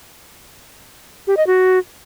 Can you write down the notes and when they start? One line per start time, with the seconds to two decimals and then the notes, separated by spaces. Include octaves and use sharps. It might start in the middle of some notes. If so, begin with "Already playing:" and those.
1.27 G4
1.37 D#5
1.47 F#4